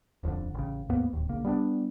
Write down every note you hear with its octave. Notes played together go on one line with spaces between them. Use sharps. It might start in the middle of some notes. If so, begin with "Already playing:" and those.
D#1 F2 A2 D3
A1 C#3
D#2 G#2 A#3 B3
D1 D#2
A#1 C#3 A#3
G3 B3 C#4 D4